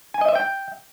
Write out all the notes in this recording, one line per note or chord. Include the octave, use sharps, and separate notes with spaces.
G#5
D#5
E5
G5